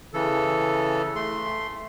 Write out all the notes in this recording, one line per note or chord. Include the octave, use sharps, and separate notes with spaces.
C#3 E3 A4
A3 C6